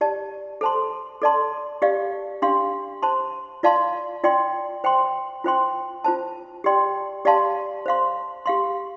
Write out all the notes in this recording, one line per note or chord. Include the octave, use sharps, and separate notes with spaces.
G4 D5 A5
A4 C5 A5 C6
A4 D5 A5 C6
G4 D5 F5
D4 G4 F5 C6
C5 A5 C6
F4 D5 F5 A5 C6
F4 D5 G5 C6
C5 G5 C6
F4 C5 G5 C6
F4 C5 A5
G4 D5 G5 C6
G4 D5 F5 A5 C6
C5 F5 C6
G4 F5 C6